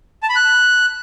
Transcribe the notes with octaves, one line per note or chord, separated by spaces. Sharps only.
A5
B5
F#6